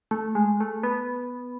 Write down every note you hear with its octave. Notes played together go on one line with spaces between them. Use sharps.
A3
G#3
A3
B3